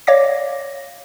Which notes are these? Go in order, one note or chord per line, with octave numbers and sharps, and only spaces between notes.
C#5 D5 F5 D6 A#6